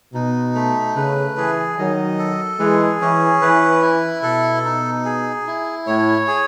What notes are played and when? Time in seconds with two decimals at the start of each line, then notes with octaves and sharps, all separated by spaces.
0.14 B2 D#4
0.55 A3
0.95 C#3 B4
1.36 E3 G#4
1.77 D#3 F#3 D#5
2.19 A4
2.60 E3 G#3 G#4
3.01 E3 C#4
3.41 E3 B4
3.82 E4
4.23 B2 A4
4.65 D#4
5.05 G#4
5.47 E4
5.87 A2 C#5
6.28 G#4